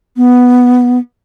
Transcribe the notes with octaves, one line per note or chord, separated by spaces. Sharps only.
B3